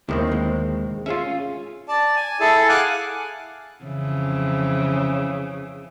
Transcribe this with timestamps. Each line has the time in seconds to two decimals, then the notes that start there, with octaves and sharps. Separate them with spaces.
0.09 D#2 B2 D#3 G#3 C4 E4
0.27 D2 G#3
1.06 C#4 F4 G#4 E5
1.88 D5 A5
2.16 G#5
2.40 E4 G#4 A4 A5
2.69 F5 F#5 G#5 D6 F#6
3.84 F2 C#3 E3